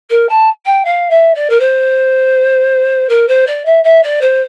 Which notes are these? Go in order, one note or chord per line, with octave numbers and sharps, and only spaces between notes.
A#4
A5
G5
F5
E5
D5
A#4
C5
A#4
C5
D5
E5
E5
D5
C5